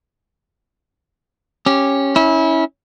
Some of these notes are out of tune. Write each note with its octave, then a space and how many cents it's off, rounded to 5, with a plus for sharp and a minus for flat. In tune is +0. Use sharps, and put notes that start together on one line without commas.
C#4 -10 G4 +0
C#4 +0 E4 -25